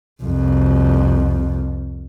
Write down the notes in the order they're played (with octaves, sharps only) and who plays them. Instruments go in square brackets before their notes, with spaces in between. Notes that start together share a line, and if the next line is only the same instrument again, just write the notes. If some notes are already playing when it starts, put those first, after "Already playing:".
[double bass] C2 F2